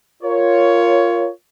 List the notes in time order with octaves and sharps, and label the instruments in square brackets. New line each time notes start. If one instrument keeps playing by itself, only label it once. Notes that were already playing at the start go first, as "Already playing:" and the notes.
[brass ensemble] F4 A#4 C#5